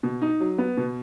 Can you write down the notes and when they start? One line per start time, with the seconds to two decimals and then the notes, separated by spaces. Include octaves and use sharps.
0.03 B2
0.22 D#4
0.40 F#3
0.58 B3
0.77 B2